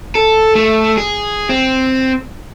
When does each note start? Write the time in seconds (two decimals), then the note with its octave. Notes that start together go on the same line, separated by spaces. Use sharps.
0.15 A4
0.55 A3
0.97 G#4
1.49 C4